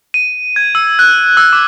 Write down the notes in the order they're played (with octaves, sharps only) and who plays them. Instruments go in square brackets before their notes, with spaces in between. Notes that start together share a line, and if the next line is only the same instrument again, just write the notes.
[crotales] D#7
G#6
E6
F#6
E6
D6